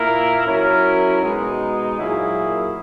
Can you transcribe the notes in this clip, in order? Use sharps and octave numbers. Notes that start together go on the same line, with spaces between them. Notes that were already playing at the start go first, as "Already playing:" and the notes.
Already playing: A#2 A#3 E4 A#4
F#3 C#4 E4 A#4
B2 G#3 B3 D#4
A#2 F#3 A#3 E4 G#4